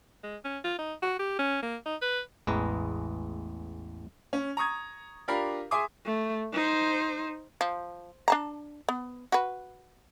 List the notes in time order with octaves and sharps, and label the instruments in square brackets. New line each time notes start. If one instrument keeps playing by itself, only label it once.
[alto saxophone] G#3
C#4
F4
D#4
F#4
G4
C#4
A#3
D#4
B4
[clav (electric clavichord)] A1 E2 G#3 B4 A#5
[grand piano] C#4
A#5 C#6 D#6 G#6
D4 F4 G4 A#4 F5 B5
G#4 E5 G#5 C6 D6 D#6
[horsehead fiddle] A3
D#4 C5
[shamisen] F3
D4 A5 A#5
B3
F#4 B4